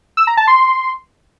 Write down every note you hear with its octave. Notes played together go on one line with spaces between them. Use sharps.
E6
A#5
A5
C6